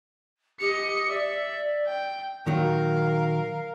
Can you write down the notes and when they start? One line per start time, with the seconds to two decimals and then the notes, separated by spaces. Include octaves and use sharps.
0.60 G4 D#5 C#7
1.10 D5 E5
1.87 G5
2.46 A#2 D#3 F#3 A#4 F5